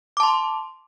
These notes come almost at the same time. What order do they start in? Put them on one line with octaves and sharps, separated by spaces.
D6 A5 C6